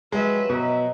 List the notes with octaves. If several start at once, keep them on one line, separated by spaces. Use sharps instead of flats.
C3 F3 F#3 G#3 B4 E5
B2 C#5 D#5 A#5